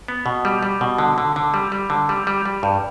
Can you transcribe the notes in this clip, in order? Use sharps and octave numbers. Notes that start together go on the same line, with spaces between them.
B3
B2
G3
G3
B2
D3
D3
D3
G3
G3
D3
G3
G3
G3
G2